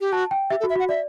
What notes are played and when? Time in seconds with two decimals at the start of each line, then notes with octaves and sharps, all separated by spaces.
0.01 G4
0.12 F#4 A5
0.31 G5
0.50 G4 E5
0.60 A4
0.63 F#4
0.70 E5
0.76 F#4 F#5
0.89 D5 E5